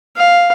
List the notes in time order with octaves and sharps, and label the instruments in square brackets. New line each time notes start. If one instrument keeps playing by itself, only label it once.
[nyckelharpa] F5